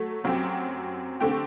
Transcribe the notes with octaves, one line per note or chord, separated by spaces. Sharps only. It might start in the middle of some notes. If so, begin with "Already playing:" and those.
Already playing: F#3 A3
F#2 F#3 C4 G4
D3 A3 C4 G4